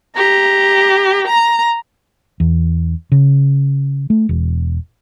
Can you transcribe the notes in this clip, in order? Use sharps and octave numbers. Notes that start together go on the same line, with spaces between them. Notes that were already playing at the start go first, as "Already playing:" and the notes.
G4 A#5
A#5
E2
C#3
A3
E1